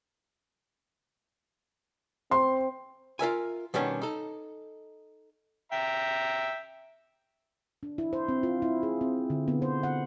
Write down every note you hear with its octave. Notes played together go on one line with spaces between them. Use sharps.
C4 C6
F4 A#4 E5 G#5
B2 D#3 G3 B3 C#4 D4
D#4 A4
E5 G5 A#5
D4
E4
C5
C4
F4
E4
G#4
C4
D3
B3
C5
F#5